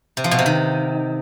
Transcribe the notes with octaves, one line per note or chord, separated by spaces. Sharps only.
C3
F3
B2
C3
D#3